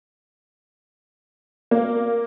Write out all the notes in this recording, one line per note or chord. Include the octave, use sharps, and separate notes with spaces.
A#3